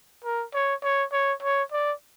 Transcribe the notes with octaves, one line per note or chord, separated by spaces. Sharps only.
A#4
C#5
C#5
C#5
C#5
D5